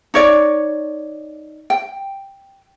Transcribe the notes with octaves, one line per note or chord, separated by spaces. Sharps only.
D#4 C#5 D5
G5